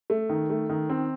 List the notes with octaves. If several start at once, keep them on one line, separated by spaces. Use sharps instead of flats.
A3
D#3
A3
D#3
C4